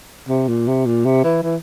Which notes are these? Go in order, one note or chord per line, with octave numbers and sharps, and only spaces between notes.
C3
A#2
C3
A#2
C3
E3
E3